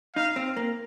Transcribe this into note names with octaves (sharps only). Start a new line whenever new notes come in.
D#4 F5
C4
A#3